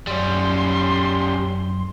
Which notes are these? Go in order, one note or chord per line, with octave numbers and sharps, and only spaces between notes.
F#2 G3 C#4 C6